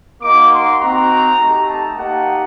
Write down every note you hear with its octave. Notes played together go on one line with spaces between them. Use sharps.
A#3 D#4 F#4 D6
C6
C4 D#4 F#4 A#5
A3 D#4 G4
A5
A#3 D#4 G4 F#5